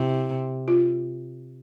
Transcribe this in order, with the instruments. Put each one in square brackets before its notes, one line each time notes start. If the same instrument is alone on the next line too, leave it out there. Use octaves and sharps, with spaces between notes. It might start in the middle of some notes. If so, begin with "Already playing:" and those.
Already playing: [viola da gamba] C3 [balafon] E4
[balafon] F4